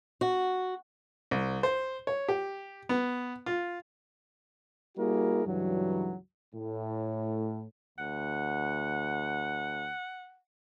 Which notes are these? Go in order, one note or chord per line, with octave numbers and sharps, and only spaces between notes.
F#4
C2
C5
C#5
G4
B3
F4
G3 A#3 E4 F#4 G#4 A#4
C#2 G2 E3 F#3
A2
D2 F#5